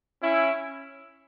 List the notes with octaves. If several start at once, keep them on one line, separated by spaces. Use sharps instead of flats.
C#4 E4